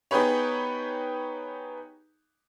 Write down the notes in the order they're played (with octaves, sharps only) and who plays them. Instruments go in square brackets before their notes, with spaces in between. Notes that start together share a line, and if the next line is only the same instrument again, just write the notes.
[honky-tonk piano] B3 D#4 G4 G#4 B4 C#5